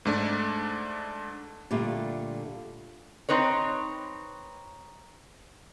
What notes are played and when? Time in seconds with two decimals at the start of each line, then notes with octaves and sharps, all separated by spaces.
0.05 G#2 A3 D4
1.71 A#2 D3 G3 A3 F4
3.29 C4 D#4 B4 C#5